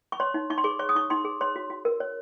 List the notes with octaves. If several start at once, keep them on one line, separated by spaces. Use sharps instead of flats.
C#6
C#5 C6
D#4
D#4 C#6
C6
G#4 C#6
C#5 C#6
D#6
D#4 C#6
D#4 C6
G#4
C#5 C6
F#4
F#4
A#4
C#5